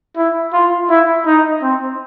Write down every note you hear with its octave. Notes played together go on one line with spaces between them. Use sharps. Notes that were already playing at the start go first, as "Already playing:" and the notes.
E4
F4
E4
D#4
C4